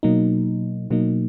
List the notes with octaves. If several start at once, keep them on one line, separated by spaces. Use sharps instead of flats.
B2 F#3 A#3 D#4
B2 F#3 A#3 D#4